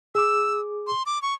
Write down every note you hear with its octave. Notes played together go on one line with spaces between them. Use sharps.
G#4 D6 E6
C6
D6
C#6